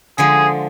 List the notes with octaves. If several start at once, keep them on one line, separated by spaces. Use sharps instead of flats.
D3 F3 G#3 G#4